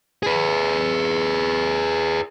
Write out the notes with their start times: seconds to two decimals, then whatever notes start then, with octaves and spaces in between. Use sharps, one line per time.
0.23 G#4 B4